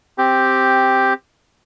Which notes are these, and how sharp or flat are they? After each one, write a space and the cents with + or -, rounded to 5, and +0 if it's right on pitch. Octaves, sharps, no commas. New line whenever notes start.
C4 +0 G4 +0